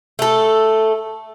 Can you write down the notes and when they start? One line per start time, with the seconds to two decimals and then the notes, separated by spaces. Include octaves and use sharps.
0.19 A3 A4